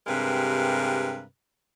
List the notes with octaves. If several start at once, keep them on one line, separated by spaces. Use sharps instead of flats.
G2 C3 G#3 A#4 B4